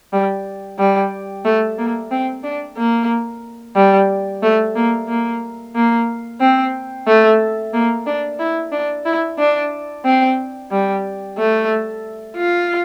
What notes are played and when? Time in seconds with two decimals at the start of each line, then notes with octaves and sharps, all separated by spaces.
0.13 G3
0.79 G3
1.45 A3
1.78 A#3
2.11 C4
2.44 D4
2.77 A#3
3.76 G3
4.43 A3
4.76 A#3
5.09 A#3
5.75 A#3
6.41 C4
7.07 A3
7.74 A#3
8.07 D4
8.39 E4
8.72 D4
9.06 E4
9.39 D4
10.05 C4
10.71 G3
11.38 A3
12.37 F4